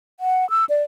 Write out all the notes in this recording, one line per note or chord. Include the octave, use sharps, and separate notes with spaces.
F#5
E6
D5